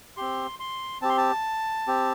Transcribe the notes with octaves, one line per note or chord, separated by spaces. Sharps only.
C4 G4 C6
C6
C4 G4 A5 C6
A5
C4 G4